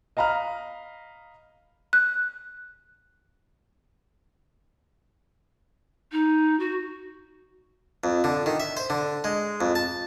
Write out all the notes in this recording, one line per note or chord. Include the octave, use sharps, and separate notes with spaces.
D#5 F5 A#5 B5 F6
F#6
D#4
F#4
F2
D3
D#3
E5
C5
D3
G#3
F2
A5